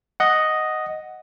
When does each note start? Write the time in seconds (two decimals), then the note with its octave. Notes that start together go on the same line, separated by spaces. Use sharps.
0.20 D#5 F#5